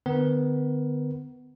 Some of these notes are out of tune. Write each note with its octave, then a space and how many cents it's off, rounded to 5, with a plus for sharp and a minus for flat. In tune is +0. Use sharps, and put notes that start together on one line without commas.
D3 +25 B3 +20 A#4 +30